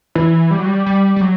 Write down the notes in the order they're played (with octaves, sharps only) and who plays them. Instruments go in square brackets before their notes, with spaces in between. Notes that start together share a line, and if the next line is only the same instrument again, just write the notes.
[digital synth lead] E3
G3
F#3
G3
G3
G3
F#3